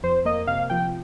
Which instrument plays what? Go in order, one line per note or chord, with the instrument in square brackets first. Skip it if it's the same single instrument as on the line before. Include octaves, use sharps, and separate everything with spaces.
[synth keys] F2 C5
A#3 D#5
C3 F5
F3 G5